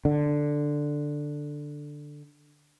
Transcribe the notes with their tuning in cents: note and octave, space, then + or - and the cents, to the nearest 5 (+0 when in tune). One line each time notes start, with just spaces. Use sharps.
D3 +5